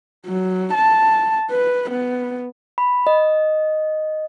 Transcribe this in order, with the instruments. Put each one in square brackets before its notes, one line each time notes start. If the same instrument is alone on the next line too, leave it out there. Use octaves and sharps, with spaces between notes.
[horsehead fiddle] F#3
A5
B4
B3
[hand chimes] B5
D#5